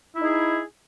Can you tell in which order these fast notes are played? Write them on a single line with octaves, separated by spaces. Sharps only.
E4 D#4 G#4